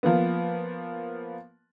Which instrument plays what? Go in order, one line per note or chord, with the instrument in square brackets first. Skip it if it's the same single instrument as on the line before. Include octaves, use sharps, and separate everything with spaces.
[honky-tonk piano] F3 A#3 B3